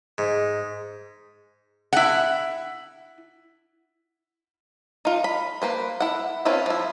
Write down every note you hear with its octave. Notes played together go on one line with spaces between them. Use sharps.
G#2
E4 F#5
D#4 F4
B5
A#3 B4 C5
E4 F#5
C4 C#4 E4 F4 B4
F3 E4